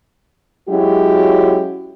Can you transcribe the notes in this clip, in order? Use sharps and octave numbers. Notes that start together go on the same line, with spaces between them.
F#3 G#3 C#4 E4 F#4 G4